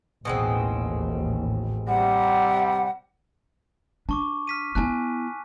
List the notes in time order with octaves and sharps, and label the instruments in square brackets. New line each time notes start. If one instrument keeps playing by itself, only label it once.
[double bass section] A1 D#2 [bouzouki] B2 G#3 C4
[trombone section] C3 G3 [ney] F#5
[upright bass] D4 [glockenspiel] A5 C#6 D6
[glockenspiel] F6 B6 D#7
[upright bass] B3 E4 [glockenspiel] G#5 A5 F#6